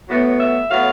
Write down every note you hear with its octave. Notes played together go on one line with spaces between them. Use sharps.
A2 F#3 B3
E5
A2 F#3 B3 F5